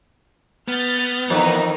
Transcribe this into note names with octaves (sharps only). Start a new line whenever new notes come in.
B3 F6 G6 A6
F2 D#3 E3 D#4